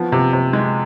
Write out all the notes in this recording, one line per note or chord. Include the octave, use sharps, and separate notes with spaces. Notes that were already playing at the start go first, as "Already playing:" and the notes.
Already playing: F3 B3
C3
C3
G#3